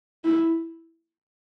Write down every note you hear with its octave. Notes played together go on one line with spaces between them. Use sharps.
E4